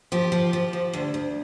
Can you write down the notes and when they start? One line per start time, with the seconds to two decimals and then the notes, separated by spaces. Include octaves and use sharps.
0.12 F3 G4
0.32 F3
0.53 F3
0.73 F3
0.93 D2
1.14 D2